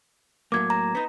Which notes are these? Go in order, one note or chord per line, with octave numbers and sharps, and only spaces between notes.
A2 F#3 A#3 D6 G#6
A#5
B3 D#4